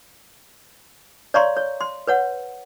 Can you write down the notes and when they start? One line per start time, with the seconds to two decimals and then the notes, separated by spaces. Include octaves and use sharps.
1.34 C#5 D5 F5 A#5 C6 C#6
1.57 C#5
1.81 C6
2.07 B4 C#5 F#5